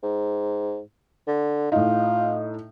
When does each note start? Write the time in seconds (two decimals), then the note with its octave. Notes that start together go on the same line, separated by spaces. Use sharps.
0.03 G#2
1.28 D3
1.72 A2 D#4 F4